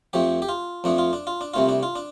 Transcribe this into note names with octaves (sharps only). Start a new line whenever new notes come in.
F2 F3 A3 G4
G4
F4
F2 F3 A3 D4
F4
D4
F4
D4
C2 C3 A3 F4
D4
F4
D4